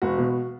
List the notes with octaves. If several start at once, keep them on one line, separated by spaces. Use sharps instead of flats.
E1 F#4
B2